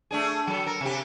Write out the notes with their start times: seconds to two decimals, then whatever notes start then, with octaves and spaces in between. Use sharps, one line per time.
0.11 A3 D4 G#4
0.47 F#3 A4
0.66 A4 A#4
0.81 C3 G4